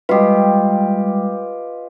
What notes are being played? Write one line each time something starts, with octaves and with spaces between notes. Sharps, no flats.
G3 G#3 F4 G4 B4 D#5